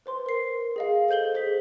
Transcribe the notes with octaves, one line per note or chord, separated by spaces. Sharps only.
B4 C5 C6
A#4 C7
G#4 D#5 F5
A4 C5 G6 F#7 G7
G#4 C5 G6 B6